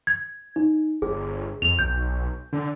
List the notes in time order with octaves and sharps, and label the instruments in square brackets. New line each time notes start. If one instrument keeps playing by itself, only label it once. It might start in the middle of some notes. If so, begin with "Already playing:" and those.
[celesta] G#6
D#4
[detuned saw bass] G1 [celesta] G#4
[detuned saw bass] F2 [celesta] F7
[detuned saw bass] B1 [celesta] G6
[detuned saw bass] D3 [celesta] D4